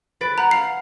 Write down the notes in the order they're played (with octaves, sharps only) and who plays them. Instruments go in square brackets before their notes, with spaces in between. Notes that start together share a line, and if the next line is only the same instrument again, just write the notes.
[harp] B4 A6 D7
[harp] F#5 F#6 [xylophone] A#5
[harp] F5 [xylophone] C7